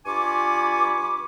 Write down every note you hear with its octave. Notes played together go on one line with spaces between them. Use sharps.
G2 F4 G#5 B5 C#6 D6